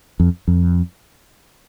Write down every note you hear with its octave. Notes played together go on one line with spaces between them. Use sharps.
F2
F2